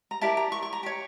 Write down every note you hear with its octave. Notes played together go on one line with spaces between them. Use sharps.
A#5
E4 G4 A#4 D5 A5
A#5
C#6
C#6
A#5
G4 C#5